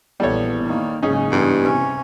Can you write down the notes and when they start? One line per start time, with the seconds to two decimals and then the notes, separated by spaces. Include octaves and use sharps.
0.20 A#1 E2 G3 B3 A4 C#5
0.63 D#3 A#3
1.03 F#1 G#2 C#3 C#4 D#4 G#4
1.32 E2 G2
1.63 C3 C#4